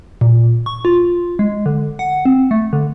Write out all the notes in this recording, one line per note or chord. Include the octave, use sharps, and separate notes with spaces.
A#2
C#6
F4
G#3
D3
F#5
C4
A3
D3